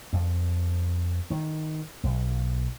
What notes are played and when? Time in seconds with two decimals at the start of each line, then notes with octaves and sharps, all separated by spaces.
0.13 F2
1.30 D#3
2.03 B1